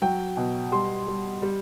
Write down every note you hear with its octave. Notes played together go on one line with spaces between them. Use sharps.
F#3 G5
B2
G3 C6
G3
G3